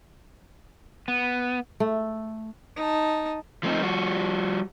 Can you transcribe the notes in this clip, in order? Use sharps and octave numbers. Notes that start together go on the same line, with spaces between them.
B3
A3
D#4 A5
F3 A3 C4 D#4
F3 G3 F#4